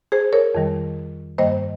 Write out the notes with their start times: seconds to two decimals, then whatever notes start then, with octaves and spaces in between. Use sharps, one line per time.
0.12 G#4 C5
0.33 A#4 C#5
0.55 F2 D#3 G3
1.38 G2 D#3 G3 A#3 C5 D#5